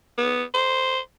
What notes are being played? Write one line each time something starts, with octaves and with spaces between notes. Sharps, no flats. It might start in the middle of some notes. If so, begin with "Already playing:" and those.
B3
C5